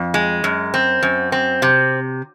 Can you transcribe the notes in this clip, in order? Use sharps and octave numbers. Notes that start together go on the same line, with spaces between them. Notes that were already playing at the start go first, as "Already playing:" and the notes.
Already playing: F2
G#3
F#2
C4
F#2
C4
C3